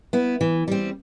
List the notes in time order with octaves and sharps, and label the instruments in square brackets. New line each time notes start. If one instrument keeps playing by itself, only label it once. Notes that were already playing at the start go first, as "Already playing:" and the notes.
[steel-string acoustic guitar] B3 E4
E3
G3 C4